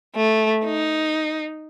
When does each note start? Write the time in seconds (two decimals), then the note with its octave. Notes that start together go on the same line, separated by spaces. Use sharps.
0.16 A3
0.65 D#4